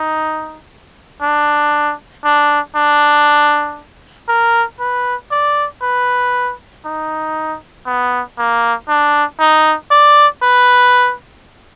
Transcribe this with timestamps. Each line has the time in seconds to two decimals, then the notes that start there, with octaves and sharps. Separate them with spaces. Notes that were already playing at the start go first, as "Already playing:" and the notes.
Already playing: D#4
1.21 D4
2.24 D4
2.75 D4
4.28 A#4
4.80 B4
5.31 D5
5.81 B4
6.85 D#4
7.86 B3
8.38 A#3
8.88 D4
9.40 D#4
9.91 D5
10.42 B4